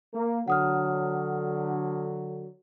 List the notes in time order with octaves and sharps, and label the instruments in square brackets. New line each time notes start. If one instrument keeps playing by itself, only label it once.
[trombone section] A#3
[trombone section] D3 F#3 [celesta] F#5 D#6 F6